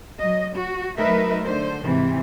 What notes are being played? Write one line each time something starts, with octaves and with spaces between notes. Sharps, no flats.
F#3 D#5
F#4
F#3 A3 D#4 A#4 B4 E5
D3 C5
G#2 C3 E3 C4